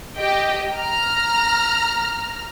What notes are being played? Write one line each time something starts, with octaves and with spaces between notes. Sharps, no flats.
G4 D#5 G5
A#5 F6